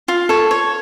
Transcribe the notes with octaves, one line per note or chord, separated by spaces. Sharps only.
F4
A4 C#5
C#5